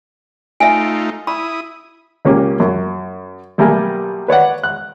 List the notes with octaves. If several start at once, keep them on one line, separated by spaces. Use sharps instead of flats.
A3 D#4 F4 E5 G#5
E4 B5 D#6
C#2 A#3 C#4 G4
F#2
B1 G3 A3 A#3 A#4 G#5
B4 C#5 D5 F#5
F#6